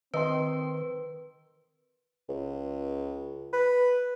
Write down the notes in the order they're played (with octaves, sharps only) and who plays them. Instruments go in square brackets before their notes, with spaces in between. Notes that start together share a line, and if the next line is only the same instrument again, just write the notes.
[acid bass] D#3 [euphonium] C4 [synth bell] B4 [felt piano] D#5 C6
[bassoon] C#2
B4